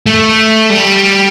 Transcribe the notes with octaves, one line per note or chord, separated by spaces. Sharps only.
A3
G3